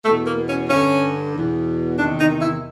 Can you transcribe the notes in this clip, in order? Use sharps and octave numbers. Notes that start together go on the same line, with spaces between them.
E2 B2 A3
A#3
C#4
G2 D3 C#4
E2 B2
E2 C3 D#3 D4
D#4
E4